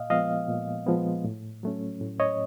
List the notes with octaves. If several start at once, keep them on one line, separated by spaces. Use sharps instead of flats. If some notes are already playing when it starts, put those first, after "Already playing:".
Already playing: A#2 D#5 F5
F3 G#3 B3 D#5 F5
A#2
F3 G#3 B3
A2
F#3 A3 C#4
A2
C#5 D#5